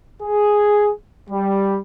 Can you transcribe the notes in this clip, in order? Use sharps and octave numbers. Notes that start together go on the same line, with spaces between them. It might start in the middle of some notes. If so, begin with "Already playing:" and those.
G#4
G3